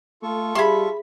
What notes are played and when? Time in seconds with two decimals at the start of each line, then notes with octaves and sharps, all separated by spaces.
0.23 A3 F4 A4 C#6
0.55 G3 G#4 E5 B5 C6